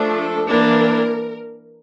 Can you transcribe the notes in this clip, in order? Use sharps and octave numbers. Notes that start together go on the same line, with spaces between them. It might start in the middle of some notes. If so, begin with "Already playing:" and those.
Already playing: F3 A3 D4
A4
E3 A#3 D4 A#4